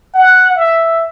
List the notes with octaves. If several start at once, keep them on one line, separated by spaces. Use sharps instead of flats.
F#5
E5